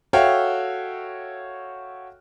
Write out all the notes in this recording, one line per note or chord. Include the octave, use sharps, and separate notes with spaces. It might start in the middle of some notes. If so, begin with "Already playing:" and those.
F#4 A4 C#5 E5 F5 G5